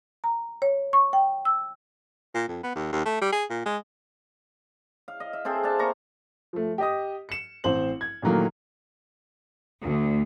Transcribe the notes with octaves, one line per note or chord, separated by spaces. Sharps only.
A#5
C#5
C#6
G5
E6
A#2
F2
B3
D#2
D#2
A3
G3
G#4
A#2
G#3
F5
D#5
E5
C4 G#4 A4 C5
D4 E5 F5 A5
A#3 A#5 C#6
F3 A3
G4 D#5 D#6
C#7 E7
A1 C4 C5 F#7
G#6
A#2 D#3 E3 F#3 A3 A#3
D2